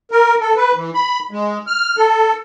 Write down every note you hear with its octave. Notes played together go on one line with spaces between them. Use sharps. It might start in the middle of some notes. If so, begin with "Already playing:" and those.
A#4
A4
B4
E3
B5
G#3
F6
A4